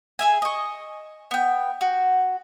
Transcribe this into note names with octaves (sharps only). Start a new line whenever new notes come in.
G#4 E5 G#5
D#5 C#6
B3 G5
F#4